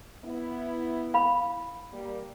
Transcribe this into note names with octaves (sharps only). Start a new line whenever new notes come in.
B3 E4
F5 B5
G3 A#3